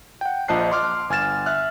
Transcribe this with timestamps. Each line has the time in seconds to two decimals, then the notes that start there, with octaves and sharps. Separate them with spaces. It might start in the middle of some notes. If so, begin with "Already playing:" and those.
0.21 F#5 G5
0.48 A#1 F3 D#5 A5 F#6 C7
0.72 C6 D6 F6
1.10 G1 G#5 F6 A6 E7
1.46 E5 F6 F#6